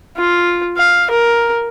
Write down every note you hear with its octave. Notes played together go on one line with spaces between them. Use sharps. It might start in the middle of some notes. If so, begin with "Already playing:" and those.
F4
F5
A#4